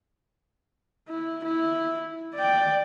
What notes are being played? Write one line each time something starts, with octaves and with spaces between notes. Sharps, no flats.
E4
E4
D5 G5